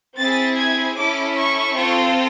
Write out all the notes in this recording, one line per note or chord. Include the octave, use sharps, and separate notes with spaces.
C4 E4 G#4 A6
G#6
C#4 E4 A4 D6
C#6
C4 F4 A4